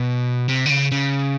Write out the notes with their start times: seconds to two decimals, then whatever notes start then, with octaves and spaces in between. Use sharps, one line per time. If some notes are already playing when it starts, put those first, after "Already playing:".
Already playing: B2
0.49 C3
0.66 D3
0.70 C#3
0.92 C#3